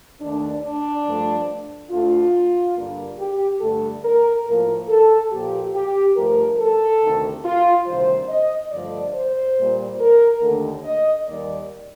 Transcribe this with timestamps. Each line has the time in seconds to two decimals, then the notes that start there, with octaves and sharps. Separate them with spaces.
0.21 D#2 D#3 A3 D4
0.63 D4
1.05 G2 F3 A3
1.91 D2 D3 A3 F4
2.76 G2 D3 G3 A#3
3.19 G4
3.61 G2 D3 A3 A4
4.04 A#4
4.46 A2 F3 A#3 A#4
4.89 A4
5.32 A#2 F3 A#3 G4
5.74 G4
6.16 G2 F3 A3 A#4
6.59 A4
7.02 D2 C3 D#3 A3
7.45 F4
7.86 D2 C3 D#3 G3 C5
8.29 D#5
8.71 G2 D3 F3 A3 D5
9.15 C5
9.57 A#2 G3 A#3
10.00 A#4
10.41 D#2 D3 A3
10.84 D#5
11.27 D#2 D#3 G3 A#3 D5